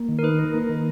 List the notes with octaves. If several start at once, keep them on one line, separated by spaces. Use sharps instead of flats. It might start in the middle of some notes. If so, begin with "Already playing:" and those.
Already playing: A#3
D#3
A#4
D#4 B4
A#4
A#3
D#3